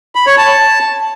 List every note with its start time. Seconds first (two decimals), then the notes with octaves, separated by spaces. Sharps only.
0.15 B5
0.27 C#5
0.38 A5